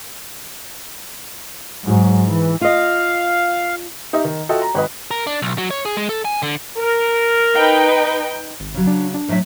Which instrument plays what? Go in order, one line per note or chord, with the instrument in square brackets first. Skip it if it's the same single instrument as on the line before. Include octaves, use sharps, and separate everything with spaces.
[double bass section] G#2 F#3
E3
[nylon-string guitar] F4 D#5 [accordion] F5
[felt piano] D#4 G4 D#5 E5
D#3
F4 F#4 A4 D#5 E5 G5
A#5
G#1 B4 D#5
[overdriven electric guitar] A#4
D4
B1
F#3
C#5
G#4
G#3
A4
G#5
D3
[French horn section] A#4
[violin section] D#4 B4 G5
[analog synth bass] G#1
[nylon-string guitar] C#3 F#3
[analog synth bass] D4
D4
[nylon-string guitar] A2 F#3 E5